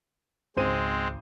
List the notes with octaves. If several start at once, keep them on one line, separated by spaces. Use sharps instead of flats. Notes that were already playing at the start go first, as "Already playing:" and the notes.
G#1 C#2 G#3 C4 C5 D#7